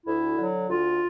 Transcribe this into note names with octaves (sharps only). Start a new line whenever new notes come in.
D2 E4
D3 F#3
D2 F4